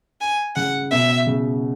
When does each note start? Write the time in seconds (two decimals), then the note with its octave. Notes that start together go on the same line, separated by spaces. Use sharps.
0.21 G#5
0.56 C#3 F#5
0.91 B2 E5
1.26 C#3